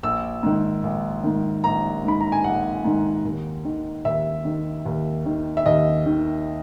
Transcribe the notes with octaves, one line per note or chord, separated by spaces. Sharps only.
A#1 E6
G#2 D#3
A#1
G#2 D#3
A#1 A#5
G#2 D#3 B5
A#5
G#5
A#1 F#5
G#2 D#3
D#2
D#3
D#2 E5
D#3
D#2
D#3
E5
D#2 D#5
D#3